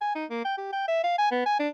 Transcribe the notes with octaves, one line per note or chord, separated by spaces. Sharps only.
G#5
D#4
A#3
G5
G4
G5
E5
F5
G#5
B3
G#5
D4